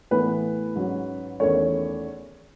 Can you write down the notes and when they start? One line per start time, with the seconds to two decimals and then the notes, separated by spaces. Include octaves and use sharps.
0.11 A2 E3 B3 B4
0.76 G#2 F#3 C#4
1.40 E2 D#3 A3 C#4 C#5